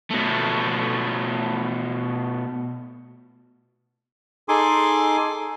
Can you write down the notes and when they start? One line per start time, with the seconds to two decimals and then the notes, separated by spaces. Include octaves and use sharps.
0.11 B2 A3
4.49 D#4 G#4 A4 G#5 C6 D6